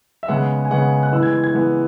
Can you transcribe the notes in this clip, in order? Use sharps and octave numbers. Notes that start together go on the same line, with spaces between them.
E5
C#3 G#3 B3 F#5
G#5
C#3 G#3 B3 F#5
F#6
E3 G#3 B3 E6
G#6
G#6
G#6
E3 G#3 B3